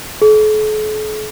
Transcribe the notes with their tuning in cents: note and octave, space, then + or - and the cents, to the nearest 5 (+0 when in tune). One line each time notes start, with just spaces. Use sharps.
A4 -45